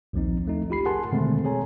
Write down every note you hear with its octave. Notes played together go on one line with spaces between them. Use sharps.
A#1 D#2 F3 C4 D#4
F3 A3 D#4
F4 G4 B5 C7
G#4 A#4 F#5 G#5 A5 C6
B2 D3 D#3 G#3 A3 C4
G#4 A4 C#5 G#5 A#5